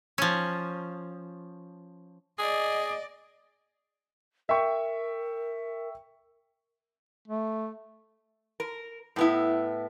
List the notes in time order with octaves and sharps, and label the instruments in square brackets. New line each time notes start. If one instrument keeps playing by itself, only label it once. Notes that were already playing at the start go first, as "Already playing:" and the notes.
[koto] F3 C#4
[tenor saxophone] G#4 [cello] D5 D#5
[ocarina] A#4 [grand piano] E5 G5 C#6
[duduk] A3
[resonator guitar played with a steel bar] A#4
A2 B3 E4